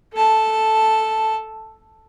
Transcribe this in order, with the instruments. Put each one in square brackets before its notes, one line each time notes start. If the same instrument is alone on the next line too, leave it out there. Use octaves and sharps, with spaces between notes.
[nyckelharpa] A4 A5